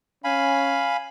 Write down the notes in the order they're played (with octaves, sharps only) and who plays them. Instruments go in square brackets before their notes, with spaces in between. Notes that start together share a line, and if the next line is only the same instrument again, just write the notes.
[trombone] C#4 [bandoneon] F5 G#5 B5